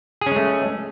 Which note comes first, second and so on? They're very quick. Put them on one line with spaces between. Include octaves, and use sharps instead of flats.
G#4 C#4 G#3 A3